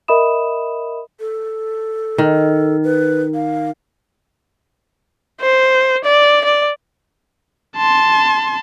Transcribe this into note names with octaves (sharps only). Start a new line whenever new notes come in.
A#4 D#5 E5 B5 D#6 E7
A4
D#3
B4
F5
C5
D5
D5
A5 C6